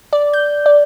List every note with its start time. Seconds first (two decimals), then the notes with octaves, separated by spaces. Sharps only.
0.13 D5
0.33 G6
0.66 D5